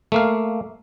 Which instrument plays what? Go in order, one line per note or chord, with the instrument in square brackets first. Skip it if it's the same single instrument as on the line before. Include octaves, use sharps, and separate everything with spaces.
[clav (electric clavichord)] A3 A#3 F5